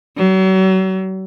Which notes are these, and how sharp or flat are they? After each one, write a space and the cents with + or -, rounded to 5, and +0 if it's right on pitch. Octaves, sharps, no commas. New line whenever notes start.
F#3 +35